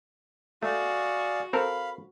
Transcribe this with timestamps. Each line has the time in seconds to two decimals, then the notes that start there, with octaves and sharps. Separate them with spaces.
0.63 A3 F#4 G#4 D5 F5
1.53 C4 A4 A#4 F5 B5